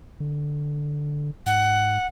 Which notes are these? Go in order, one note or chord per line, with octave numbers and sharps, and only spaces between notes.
D3
G#2 F#5